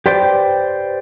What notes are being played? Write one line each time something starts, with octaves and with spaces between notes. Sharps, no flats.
G4 B4 C5 D5 G5